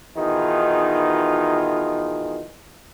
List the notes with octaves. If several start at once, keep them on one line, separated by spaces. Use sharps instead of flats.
B2 D#3 E3 D#4 F4 G#4